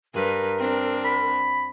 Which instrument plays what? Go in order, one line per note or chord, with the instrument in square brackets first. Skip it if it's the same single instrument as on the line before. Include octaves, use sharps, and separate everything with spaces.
[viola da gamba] G2 B4 [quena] A#4
[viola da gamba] C4 D4
[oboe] B5